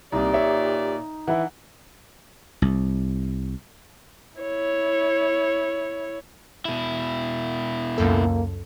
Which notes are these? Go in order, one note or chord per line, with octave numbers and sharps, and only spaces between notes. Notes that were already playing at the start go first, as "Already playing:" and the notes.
C2 A#2 D#4 G4 D5
C#5 E5
E3 E4 F#5
C2
E4 C#5
B2 E4
C#2 F#2 A#3 A4